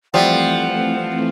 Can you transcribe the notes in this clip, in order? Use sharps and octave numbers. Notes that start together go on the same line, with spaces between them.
E3 F3 G3 A3 C4 E4 F#5